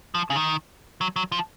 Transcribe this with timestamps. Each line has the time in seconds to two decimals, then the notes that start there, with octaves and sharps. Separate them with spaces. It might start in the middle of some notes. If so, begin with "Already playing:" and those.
0.15 F3
0.30 C#3
0.36 D#3
1.01 F#3
1.16 F#3
1.32 F3